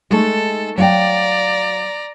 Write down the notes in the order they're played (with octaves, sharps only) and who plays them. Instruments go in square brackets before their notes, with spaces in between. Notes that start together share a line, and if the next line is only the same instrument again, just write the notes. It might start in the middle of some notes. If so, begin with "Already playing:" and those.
[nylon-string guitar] G#3 A3 D#4 [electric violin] A4
[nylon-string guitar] F#3 F5 G5 [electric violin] D5 A#5